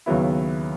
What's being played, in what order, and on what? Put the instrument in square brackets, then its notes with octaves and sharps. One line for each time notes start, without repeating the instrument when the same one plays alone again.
[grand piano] D#2 C#3 F#3 B3 E4